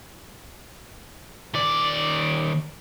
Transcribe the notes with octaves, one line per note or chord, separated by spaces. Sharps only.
D#2 D5